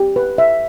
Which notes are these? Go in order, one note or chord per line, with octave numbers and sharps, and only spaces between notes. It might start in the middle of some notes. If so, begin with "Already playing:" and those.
Already playing: G4
B4
E5